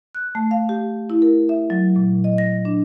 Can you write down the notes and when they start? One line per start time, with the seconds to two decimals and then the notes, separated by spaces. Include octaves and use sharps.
0.15 F#6
0.35 A3
0.51 F5
0.69 G4
1.10 E4
1.22 A#4
1.49 E5
1.70 F#3
1.96 A#2
2.24 D#5
2.38 A#6
2.65 D4